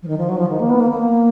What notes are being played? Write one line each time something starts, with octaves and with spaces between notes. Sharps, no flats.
F3
D#3
F3
F#3
F3
D#3
A#3
B3
A#3
A#3